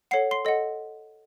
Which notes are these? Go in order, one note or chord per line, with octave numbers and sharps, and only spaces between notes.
A4 C#5 F#5 C7
C6 C7
A4 D#5 F#5